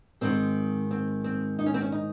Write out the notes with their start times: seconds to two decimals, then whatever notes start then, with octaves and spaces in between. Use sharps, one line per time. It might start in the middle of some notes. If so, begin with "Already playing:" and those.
0.21 G#2 D#3 G#3 C4
0.91 C4
1.24 C4
1.59 D#4
1.66 C#4
1.74 C4
1.81 C#4
1.92 D#4